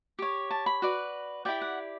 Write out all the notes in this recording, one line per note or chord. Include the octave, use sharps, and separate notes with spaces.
G4 C#5
A5
B5
F#4 B4 D5
E4 G4 D5 G5
F#5